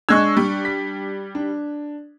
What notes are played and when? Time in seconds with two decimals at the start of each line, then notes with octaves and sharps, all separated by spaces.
0.09 G#3 D4 C#6 E6 F#6 G#6
0.37 G3
0.65 B6
1.35 D4